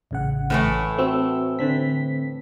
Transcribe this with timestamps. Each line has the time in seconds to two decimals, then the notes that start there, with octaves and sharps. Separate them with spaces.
0.11 A1 C#3 F#5
0.50 A2 E3 A3
0.98 C4 F#4 E6
1.59 D3 C4 B6